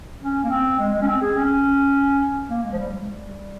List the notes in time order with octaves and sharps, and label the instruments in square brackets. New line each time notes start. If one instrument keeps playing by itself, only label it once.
[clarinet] C#4
A#3
C4
G#3
G#3
C#4
C4
G#4
C#4
A#3
G#3
F3
G3
G#3
G3